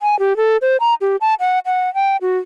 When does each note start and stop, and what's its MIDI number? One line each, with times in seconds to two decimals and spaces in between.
0.01 0.18 80
0.19 0.36 67
0.37 0.57 69
0.62 0.77 72
0.80 0.94 82
1.01 1.16 67
1.21 1.34 81
1.40 1.59 78
1.66 1.93 78
1.95 2.17 79
2.22 2.39 66